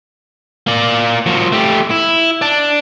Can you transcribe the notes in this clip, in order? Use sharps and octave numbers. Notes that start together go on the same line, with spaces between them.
A#3 D5
F3 F#4
A3 G4
E4
D5 A5